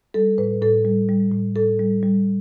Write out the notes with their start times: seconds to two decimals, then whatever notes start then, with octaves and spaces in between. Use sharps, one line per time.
0.14 G3 A4
0.38 A2 B4
0.62 A2 A4
0.85 G3
1.09 G3
1.32 A2
1.56 A2 A4
1.79 G3
2.03 G3